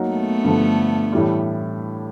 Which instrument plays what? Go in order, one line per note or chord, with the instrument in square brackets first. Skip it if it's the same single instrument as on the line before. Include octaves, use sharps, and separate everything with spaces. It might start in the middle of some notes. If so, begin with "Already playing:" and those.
Already playing: [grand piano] F#3 A#3 D#4 F#4
[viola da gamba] A3 B3
[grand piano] G2 D3 F3
A2 E3 G3